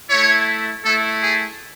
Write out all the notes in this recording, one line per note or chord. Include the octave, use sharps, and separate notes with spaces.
A3 E4 C#5
A3 E4 A4
G#4